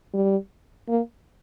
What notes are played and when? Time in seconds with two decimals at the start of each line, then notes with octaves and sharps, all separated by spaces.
0.13 G3
0.88 A#3